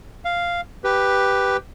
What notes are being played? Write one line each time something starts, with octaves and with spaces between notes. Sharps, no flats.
F5
G4 B4